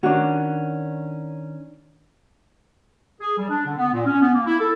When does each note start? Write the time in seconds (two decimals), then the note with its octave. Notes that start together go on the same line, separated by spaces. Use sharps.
0.03 D#3 C#4 D4 F#4
3.21 G#4
3.38 G3
3.50 D4
3.66 D3
3.78 B3
3.93 A#2
4.06 C#4
4.21 B3
4.34 A#3
4.46 E4
4.59 A4